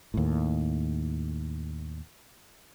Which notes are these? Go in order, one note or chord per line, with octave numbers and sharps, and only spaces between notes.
D#2 A2